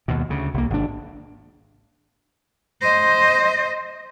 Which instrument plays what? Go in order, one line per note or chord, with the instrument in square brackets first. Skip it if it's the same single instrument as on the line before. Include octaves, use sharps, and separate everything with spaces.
[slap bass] D#2 B2
D2 C#3
C2 A#3
G#1 D4
[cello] C5 D#5